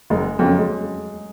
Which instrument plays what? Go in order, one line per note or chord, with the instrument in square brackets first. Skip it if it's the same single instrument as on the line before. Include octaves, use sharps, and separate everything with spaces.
[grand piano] F#1 [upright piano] G#3
[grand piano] F2 C#3 [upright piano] F#3
[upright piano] G#3